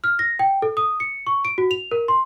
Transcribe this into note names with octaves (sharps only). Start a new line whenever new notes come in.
F6
A#6
G5
A4
D#6
C#7
C#6
D7
F#4
F7
A#4
C6